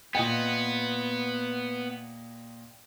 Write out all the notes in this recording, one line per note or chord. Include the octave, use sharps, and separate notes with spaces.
A#2 B3 D#5 G5